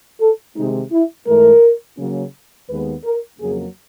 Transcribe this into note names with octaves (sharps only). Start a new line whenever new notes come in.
A4
C3 D#3 G#3 D#4
E4
G#2 E3 A3 A#4
C#3 F#3 A#3 C#4
D#2 D#3 G#3 B3 B4
A#4
F2 C#3 F#3 A#3 G#4